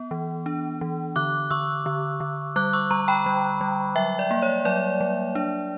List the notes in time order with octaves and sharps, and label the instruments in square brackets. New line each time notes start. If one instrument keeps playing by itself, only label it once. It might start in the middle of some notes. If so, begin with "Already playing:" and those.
Already playing: [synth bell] B3
E3
D4
E3
D3 D6 F#6
D3 C#6 E6
D3
D3
G3 D6 F#6
C#6 E6
G3 A#5 C#6
G5 B5
G3
G3
F#3 E5 G5
D5
A#3
C#5
F#3 D5
F#3
D4